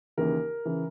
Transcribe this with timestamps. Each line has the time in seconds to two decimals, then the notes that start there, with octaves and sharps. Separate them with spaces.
0.17 D#2 C#3 E3 A#4
0.65 C#3 E3